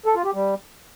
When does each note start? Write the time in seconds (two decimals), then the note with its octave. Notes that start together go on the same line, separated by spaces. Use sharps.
0.06 A4
0.15 F4
0.25 G4
0.34 G3